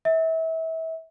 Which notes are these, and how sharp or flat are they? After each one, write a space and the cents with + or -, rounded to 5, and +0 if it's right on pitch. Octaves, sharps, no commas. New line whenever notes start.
E5 -30